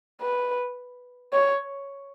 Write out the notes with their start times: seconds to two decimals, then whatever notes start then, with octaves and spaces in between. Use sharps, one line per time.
0.21 B4
1.33 C#5